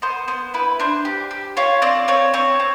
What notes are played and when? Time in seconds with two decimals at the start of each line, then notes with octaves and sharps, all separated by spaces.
0.02 B3 C5
0.28 B3 C5
0.54 E4 B4
0.80 D4 C5
1.05 G4
1.31 G4
1.57 F4 C#5
1.82 C4 D5
2.08 C4 C#5
2.34 C4 C#5
2.60 C4